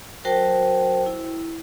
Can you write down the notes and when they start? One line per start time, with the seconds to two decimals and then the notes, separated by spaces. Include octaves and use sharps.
0.25 F#3 F#4 A#4 C5 G5 A5
1.06 E4